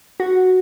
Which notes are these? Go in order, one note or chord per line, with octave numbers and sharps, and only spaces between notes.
F#4